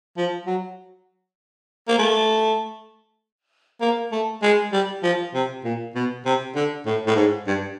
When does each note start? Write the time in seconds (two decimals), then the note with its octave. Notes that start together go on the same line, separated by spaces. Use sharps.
0.17 F3
0.47 F#3
1.88 A#3
1.99 A3
3.81 A#3
4.12 A3
4.43 G#3
4.72 G3
5.03 F3
5.34 C3
5.64 A#2
5.95 B2
6.25 C3
6.55 D3
6.86 A2
7.07 A2
7.16 G#2
7.47 G2